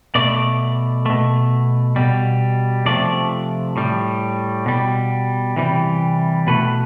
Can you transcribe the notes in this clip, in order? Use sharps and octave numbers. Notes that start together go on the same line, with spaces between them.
B2 A3 D5
B2 A3
B2 G3
C3 F3 A3 D5
A2 G3
B2 G3
C3 E3 G3
B2 A3 B4